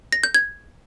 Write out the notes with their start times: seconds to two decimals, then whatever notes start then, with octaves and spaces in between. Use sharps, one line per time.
0.12 A#6
0.23 G6
0.35 G#6